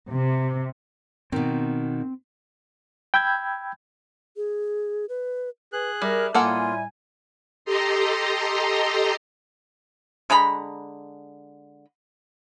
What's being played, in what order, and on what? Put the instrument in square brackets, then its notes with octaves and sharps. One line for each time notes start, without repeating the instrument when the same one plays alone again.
[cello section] C3
[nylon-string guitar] B2 D#3 [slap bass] C4
[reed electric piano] G5 B5 E6 G6 G#6
[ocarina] G#4
B4
[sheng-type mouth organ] G#4 F#6 [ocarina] B4
[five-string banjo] G3 [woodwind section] A#4 [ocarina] E5
[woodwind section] A2 G3 G#5 [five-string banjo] A#3 A4 F#5 [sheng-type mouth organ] F4
[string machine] G4 A4 D#5 A#5 C6
[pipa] D3 G#3 A#5 B5